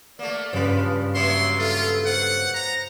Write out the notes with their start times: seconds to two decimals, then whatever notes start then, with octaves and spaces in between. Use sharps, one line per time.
0.19 A3 A#3 D5
0.53 G2 C#3 F3 B4
1.15 F#3 A#3 B3 E5 C6
1.59 F4 A4
2.06 C5 F#5
2.54 A#5